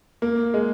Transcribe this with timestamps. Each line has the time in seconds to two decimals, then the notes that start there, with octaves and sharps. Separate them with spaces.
0.22 A#3
0.54 G#3